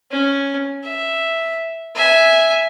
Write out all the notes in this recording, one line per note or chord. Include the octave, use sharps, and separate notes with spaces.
C#4
E5
E5 G#5